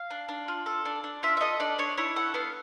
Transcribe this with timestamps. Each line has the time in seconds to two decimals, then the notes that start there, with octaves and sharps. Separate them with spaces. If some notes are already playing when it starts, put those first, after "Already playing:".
Already playing: F5
0.10 D4
0.29 D4
0.48 F4
0.66 A4
0.85 D4
1.04 D4
1.23 F4 E5
1.37 E5
1.41 A4 D#5
1.60 D4 D5
1.79 D4 C#5
1.97 E4 C#5
2.16 A4 F#5
2.34 B3 F5